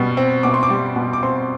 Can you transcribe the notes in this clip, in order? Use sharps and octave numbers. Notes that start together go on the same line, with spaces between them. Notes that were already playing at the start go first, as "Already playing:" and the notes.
Already playing: B2 G3
C4
B2 D6
C6
D6
G3
B2
D6
C4 C6